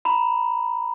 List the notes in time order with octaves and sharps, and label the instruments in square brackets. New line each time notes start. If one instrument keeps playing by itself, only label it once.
[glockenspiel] A#5 B5